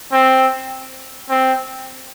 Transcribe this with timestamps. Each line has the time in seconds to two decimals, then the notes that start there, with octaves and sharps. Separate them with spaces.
0.12 C4
1.30 C4